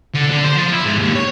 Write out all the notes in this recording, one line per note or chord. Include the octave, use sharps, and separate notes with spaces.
D3
D3
C5
F3
E4
G#2
D#2
C#5